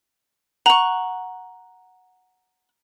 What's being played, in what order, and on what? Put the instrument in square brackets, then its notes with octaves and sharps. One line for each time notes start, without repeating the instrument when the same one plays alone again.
[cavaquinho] F#5 C#6 [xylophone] A#5